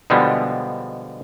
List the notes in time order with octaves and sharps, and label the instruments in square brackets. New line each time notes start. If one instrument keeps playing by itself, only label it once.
[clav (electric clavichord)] B2 D3 F3 G3 G#3 B3